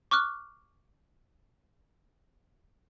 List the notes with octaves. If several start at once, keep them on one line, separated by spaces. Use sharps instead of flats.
C#6 D6 F6 F#6